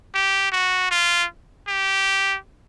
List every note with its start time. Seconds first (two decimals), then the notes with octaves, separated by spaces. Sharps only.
0.14 G4
0.52 F#4
0.91 F4
1.68 G4